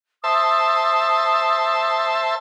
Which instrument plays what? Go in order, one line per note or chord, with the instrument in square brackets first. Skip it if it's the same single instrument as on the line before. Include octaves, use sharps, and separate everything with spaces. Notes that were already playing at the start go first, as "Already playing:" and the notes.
[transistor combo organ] C5 E5 A5 [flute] D#6